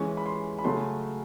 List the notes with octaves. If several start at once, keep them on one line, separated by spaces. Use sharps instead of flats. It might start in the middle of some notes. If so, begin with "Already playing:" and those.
Already playing: E3 G#3 C#4 C#6
B5
C6
B5
C#3 F#3 A3 C#4 C6